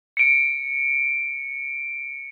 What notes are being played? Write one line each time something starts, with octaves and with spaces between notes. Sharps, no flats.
C#7 D7